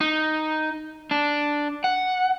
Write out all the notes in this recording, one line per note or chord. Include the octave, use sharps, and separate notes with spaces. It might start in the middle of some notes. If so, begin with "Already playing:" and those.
D#4
D4
F#5